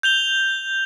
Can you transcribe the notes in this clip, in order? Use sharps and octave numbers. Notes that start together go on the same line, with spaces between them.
G6 F7 G7